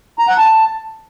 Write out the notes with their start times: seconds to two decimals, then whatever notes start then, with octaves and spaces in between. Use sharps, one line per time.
0.19 A#5
0.28 F#5
0.38 A5